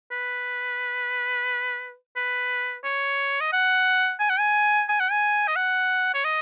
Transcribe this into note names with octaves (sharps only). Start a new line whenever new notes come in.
B4
B4
C#5
D#5
F#5
G#5
F#5
G#5
G#5
F#5
G#5
D#5
F#5
C#5
D#5